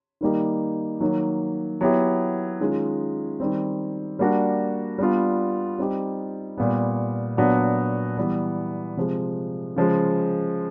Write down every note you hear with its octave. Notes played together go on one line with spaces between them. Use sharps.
D#3 G3 A#3 D#4 G4
D#3 F#3 A#3
F#3 B3 E4 G4
D#3 G#3 C#4 F4
D#3 G3 C4
G3 A#3 D4 F#4
G3 B3 D4 F4
G3 C4 D#4 G4
A#2 G3 B3
A#2 F#3 B3 D4 F#4
E3 G3 B3
C3 F3 G#3
C#3 F3 G#3